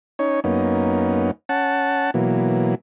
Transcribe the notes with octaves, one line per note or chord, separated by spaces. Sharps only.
C#4 D#4 C#5
F#2 A#3 B3 C#4 D#4
C#4 F#5 A5
B2 E3 F#3 A#3